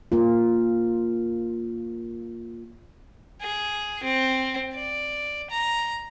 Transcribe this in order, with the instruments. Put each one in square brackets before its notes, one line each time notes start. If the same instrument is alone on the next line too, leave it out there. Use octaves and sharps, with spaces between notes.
[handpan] A#3 F4
[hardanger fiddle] G#4
C4
D5
A#5